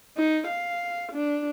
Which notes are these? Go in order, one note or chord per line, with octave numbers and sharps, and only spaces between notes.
D#4
F5
D4